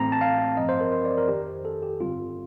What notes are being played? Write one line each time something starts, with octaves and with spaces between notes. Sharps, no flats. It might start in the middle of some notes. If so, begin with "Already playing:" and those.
Already playing: A1 A2 A3 C4 A#5
A5
F5
A1 G2 F3 C4 D#5
C5
A#4
C5
D5
A#4
G1 F2 D#3 G4
A4
G4
G1 G2 D3 G3 C4 F4